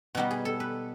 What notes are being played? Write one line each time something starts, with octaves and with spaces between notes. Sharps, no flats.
B2 G3 B3 D#4
G#4
A4
B4